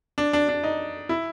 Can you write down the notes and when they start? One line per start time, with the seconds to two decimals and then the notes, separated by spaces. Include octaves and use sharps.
0.18 D4
0.33 D4
0.49 D4
0.63 D#4
1.09 E4